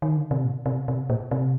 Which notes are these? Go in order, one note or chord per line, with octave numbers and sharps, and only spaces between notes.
D#3
D3
C3
A#2
C3
C3
A#2
C3